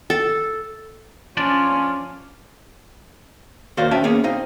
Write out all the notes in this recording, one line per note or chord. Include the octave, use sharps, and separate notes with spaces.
A4
F3 C#4 D4 F4 D5
D#2 F#4 A#4 C5 D5 F5
C#4 E5 G5 A5
A#3 B3 C#4 G#4
C4 D#4 D#5 F5